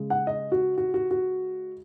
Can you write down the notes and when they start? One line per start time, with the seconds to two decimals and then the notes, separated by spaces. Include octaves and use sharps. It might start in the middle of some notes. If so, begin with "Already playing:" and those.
Already playing: C#3 G#3
0.10 F#5
0.27 D#5
0.52 F#4
0.78 F#4
0.94 F#4
1.11 F#4